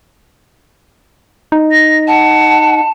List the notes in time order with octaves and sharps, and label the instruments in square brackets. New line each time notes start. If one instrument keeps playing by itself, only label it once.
[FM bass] D#4
[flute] A#6
[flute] F#5 [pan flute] A5